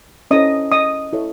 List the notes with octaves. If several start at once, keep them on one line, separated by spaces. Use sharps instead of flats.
C#4 E4 A4 C5 D#5 D#6
D#5 D#6
E4 A4 C#5